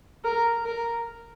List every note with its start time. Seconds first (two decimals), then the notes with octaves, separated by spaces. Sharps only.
0.24 A#4
0.65 A#4